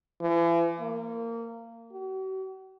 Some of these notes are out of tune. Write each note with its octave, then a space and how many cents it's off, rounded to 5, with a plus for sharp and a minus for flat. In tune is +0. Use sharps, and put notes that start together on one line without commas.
E3 +40
A#3 -20
F#4 +45